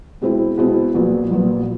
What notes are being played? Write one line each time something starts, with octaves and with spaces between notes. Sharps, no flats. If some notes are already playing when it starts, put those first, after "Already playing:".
B2 G#3 C4 E4
B2 G#3 C4 E4
A#1 A#2 F#3 B3
A#1 A#2 F#3 B3